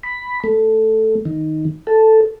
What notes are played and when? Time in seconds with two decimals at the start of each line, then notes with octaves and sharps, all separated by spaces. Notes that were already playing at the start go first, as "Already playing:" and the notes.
0.03 B5
0.44 A3
1.25 D#3
1.87 A4